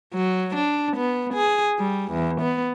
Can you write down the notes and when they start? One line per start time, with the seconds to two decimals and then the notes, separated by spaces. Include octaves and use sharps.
0.14 F#3
0.56 D4
0.97 B3
1.34 G#4
1.79 G3
2.12 E2
2.41 B3